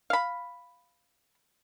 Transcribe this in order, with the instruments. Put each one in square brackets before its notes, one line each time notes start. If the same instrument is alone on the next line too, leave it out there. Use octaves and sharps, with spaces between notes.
[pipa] F5 B5